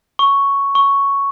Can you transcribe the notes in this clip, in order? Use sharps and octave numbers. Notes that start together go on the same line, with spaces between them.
C#6
C#6